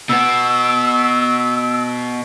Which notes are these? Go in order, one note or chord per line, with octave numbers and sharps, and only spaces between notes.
B2 B3 E6